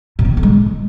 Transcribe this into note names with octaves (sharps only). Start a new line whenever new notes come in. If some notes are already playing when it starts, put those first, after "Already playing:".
C3
C4
B3
D3
G#3